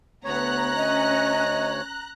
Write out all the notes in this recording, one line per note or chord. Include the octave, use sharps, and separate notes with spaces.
D2 B3 C#5 A#5 F#6
C#4 D#5